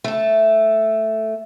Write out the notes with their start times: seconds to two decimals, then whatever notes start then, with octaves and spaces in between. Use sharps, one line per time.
0.04 A3 A4